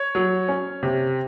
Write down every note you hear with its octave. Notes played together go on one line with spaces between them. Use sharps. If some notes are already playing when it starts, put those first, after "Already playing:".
Already playing: C#5
F#3
C#4
C3